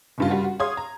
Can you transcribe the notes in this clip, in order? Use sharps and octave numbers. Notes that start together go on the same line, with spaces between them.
F#1 G2 F4
G3 F4 F#4
F#4
G#4 C#5 F5 C6 D#6 G#6
A#5